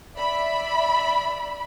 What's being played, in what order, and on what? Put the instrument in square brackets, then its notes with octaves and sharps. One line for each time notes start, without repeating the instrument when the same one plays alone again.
[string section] D5 E5 B5